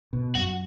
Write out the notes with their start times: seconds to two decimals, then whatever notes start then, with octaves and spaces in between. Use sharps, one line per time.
0.13 B2
0.35 F#2 F#4